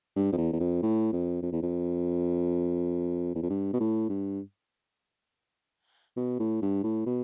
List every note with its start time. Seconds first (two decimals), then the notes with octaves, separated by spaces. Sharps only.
0.16 G2
0.33 F2
0.37 E2
0.53 E2
0.60 F2
0.82 A2
1.12 F2
1.42 F2
1.52 E2
1.62 F2
3.35 E2
3.43 F2
3.49 G2
3.73 B2
3.80 A2
4.09 G2
6.17 B2
6.40 A2
6.62 G2
6.83 A2
7.06 B2